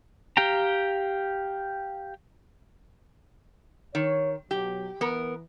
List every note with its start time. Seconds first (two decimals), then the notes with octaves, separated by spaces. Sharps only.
0.37 G4 F5 G5 A#5
3.95 D#3 C#5
4.51 B2 F#3 G4
5.01 E3 B3 A#4